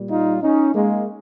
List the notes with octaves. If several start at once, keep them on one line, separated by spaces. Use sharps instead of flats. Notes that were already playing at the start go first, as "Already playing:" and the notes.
Already playing: A#2 G3
D#4 F4
C#4 D#4
G#3 A#3